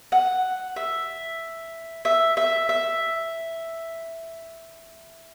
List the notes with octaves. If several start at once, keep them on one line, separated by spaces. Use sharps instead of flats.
F#5
E5
E5
E5
E5